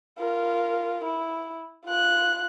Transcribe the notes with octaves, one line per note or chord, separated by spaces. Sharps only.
F4 A#4
E4
F4 F#6